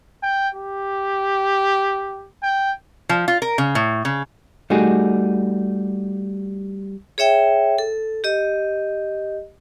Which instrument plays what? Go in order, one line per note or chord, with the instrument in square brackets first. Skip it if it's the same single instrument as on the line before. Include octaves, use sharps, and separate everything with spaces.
[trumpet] G5
G4
G5
[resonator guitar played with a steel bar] F3
F4
A#4
C#3
A2
C#3
[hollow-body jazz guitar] G3 A3 D#4 F#4 G#4
[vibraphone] G#4 C#5 E5 G5
A4
G4 D#5